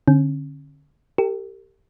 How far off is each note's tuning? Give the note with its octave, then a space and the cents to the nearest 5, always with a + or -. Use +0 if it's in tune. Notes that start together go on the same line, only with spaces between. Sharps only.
D3 +0 C#4 -40
G4 +0 A#4 -45